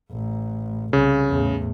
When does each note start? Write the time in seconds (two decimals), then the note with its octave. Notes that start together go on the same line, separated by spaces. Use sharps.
0.12 A1
0.93 C2 C#3
1.28 E2 A2